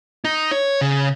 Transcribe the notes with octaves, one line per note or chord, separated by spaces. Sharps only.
D#4
C#5
C#3